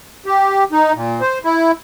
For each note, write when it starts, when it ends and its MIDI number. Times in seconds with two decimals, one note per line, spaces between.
0.26 0.64 67
0.72 0.92 63
0.95 1.21 46
1.21 1.38 72
1.44 1.71 64